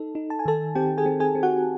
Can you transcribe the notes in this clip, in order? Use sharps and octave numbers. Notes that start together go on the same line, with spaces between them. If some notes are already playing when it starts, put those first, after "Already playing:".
Already playing: D#4 A4
D#4
A5
G#5
D#3 A4 A5
C4 G4 G5
G#4 G#5
C4
G#4 G#5
C4
F#4 F#5